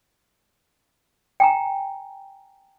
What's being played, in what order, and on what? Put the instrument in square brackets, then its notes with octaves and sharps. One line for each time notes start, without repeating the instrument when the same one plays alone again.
[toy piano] G5 G#5 A#5